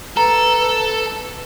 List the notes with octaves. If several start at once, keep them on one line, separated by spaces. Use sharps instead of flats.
A4 B4 A#5